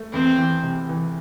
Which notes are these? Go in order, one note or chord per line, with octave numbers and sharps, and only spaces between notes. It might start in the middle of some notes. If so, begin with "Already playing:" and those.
Already playing: A3
E2 C4
E3
C3
E3